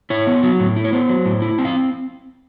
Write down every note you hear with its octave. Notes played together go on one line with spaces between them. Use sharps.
E4 C#5
B3
F#3
A2
E4
C#5
B3 C5
F#3
A2
E4
C4
F5